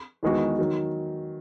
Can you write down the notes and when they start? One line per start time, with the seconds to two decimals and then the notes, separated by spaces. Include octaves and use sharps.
0.23 E2 D#3 G#3 B3 F#4
0.59 D#3 F#3